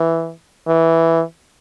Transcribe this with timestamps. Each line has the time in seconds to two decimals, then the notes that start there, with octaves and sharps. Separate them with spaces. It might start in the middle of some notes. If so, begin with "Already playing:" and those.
Already playing: E3
0.67 E3